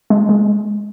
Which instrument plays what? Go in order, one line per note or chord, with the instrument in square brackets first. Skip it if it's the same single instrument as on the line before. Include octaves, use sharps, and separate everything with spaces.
[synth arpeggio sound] G#3
G#3